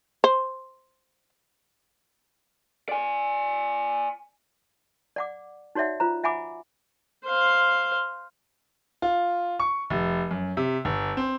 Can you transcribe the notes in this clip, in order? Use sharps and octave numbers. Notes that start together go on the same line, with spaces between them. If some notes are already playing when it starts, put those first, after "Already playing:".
C5
D5 G#5
D5 F#5 D6
D#4 F#4 C#5 D5 E5 F#5
F4 C5 A#5
E5 F#5 G#5 B5 D6
C5 F5
F4
C#6
F1
F#2
C3
G1
C4